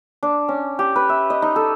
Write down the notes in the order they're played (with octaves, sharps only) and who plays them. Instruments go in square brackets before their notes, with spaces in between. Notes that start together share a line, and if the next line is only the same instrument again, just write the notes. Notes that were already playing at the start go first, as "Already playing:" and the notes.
[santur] D4
C#4
G4
B4
E5
D#5
D#4
A4